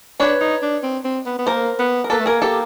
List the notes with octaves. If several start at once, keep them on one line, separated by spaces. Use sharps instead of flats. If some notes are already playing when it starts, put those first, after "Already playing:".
D4 B4 C#5
D#4
D4
C4
C4
B3
B3
A#3 A#4 C5
B3
A#4
A#3 A4 B4
A3
A#3 G#4 A#4
G4 A4